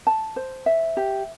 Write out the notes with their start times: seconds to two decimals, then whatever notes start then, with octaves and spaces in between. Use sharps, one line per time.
0.07 A5
0.36 C5
0.66 E5
0.97 G4